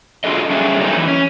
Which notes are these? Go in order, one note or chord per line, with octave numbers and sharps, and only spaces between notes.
D4 F4 F#4 G#4 A4 D#5
G3 C#4 D4 G#4 A4 E5
F#3 G3 A#3 C4 D#4 G#4
E3
C#4